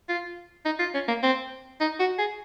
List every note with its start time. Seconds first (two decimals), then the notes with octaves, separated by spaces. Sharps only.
0.09 F4
0.65 D#4
0.80 F4
0.94 C#4
1.08 A#3
1.23 C4
1.81 D#4
1.99 F#4
2.18 G#4